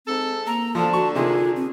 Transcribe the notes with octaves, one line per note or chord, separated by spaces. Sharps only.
G#2 C4 A4
A#3 A#5
D2 D3 F3 A5
F#4 C#6
C3 D#3 A#3 F4 G#4
C4